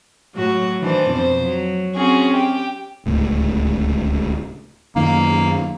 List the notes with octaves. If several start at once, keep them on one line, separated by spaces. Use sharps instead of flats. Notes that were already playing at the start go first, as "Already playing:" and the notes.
A2 F#3 F#4
D#3 E3 D4 C5
F2 B2 C5
F#3
C4 C#4 F#4 G#4
G4 G5
D1 C#2 A2
F#2 D#3 A#3